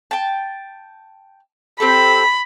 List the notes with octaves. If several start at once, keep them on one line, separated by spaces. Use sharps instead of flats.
G5 A5
C4 G4 A4 B5